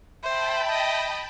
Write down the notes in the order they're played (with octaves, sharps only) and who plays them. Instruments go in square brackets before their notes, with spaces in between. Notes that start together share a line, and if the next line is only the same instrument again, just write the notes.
[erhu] C5 [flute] E5 [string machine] G5 A5 B5
[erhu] D#5